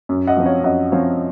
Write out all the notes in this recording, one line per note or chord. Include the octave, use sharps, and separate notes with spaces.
F#2
D#5 F#5
F3 C4
C#5 F5
F#2 D#5 F#5
F3 C4 C#5 F5